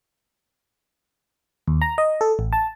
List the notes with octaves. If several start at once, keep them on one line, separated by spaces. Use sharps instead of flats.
D#2
A#5
D#5
A4
A1
A5